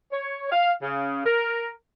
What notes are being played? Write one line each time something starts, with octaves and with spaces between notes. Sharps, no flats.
C#5
F5
C#3
A#4